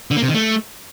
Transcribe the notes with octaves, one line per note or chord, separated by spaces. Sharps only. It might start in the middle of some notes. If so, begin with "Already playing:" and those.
D3
A#3
C3
D#3
A3